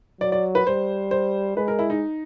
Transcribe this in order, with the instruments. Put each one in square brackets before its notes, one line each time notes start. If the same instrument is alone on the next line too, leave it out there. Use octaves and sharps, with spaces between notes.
[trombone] F#3 [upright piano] D5
[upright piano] D5
B4
[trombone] G3 [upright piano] C5
[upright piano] C5
[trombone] G#3 [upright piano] B4
[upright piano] A#4
E4
D#4